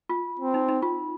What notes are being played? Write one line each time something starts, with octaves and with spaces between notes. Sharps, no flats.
F4
C4
D#4
D#4
F4